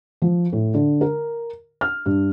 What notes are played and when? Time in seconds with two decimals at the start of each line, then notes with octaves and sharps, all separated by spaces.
0.22 F3
0.53 A2
0.74 D3
1.01 A#4
1.81 F6
2.06 G2